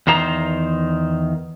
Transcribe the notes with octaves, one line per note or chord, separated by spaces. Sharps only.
E2 D#3 C5 A#5